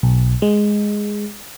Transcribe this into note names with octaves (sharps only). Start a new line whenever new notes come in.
B1
G#3